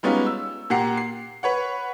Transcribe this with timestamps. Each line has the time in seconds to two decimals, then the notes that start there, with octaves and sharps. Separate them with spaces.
0.03 G3 G#3 B3 C#4 D#4 F4
0.26 E6
0.70 A#2 G4 F#5 A#5 C7
0.97 C7
1.43 B4 C#5 F#5